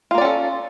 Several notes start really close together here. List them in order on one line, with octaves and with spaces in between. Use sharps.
F4 A#3 D5 C#4 A4